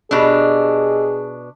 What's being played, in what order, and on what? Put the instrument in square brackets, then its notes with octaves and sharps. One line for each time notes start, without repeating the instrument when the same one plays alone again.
[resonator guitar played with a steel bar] B2 D4 [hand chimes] G4 D#5 E6 [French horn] G#4